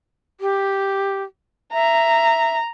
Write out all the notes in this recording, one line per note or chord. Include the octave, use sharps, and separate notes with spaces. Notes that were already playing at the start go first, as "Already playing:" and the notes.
G4
E5 A#5